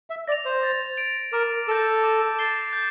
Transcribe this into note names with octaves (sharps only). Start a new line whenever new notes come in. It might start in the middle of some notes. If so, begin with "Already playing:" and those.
E5
D5 A#6 F7
C5
A6
D7 F7
A#4 D6
A4 G6 A#6 E7
D6
A6 C7 G7
G6